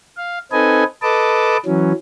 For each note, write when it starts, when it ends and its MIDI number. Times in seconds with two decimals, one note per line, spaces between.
0.17 0.39 77
0.52 0.84 60
0.52 0.84 63
0.52 0.84 69
0.52 0.84 71
0.52 0.84 75
0.52 0.84 80
1.02 1.57 69
1.02 1.57 71
1.02 1.57 75
1.02 1.57 81
1.02 1.57 86
1.66 1.93 52
1.66 1.93 54
1.66 1.93 61